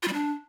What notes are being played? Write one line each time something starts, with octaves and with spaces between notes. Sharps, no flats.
F4
G3
D4